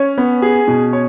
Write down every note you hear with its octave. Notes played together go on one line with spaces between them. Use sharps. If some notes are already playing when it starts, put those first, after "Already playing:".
Already playing: C#4 C#5
B3
G#4
B2
C#5